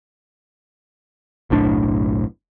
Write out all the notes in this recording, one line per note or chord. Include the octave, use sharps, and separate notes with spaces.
F#1 B1 A2 D4